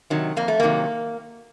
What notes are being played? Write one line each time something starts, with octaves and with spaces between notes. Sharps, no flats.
C3 D#3 F#3
F2 A#3
A3
C3 D#3 F#3 A#3